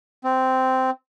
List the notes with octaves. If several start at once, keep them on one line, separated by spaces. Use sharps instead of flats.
C4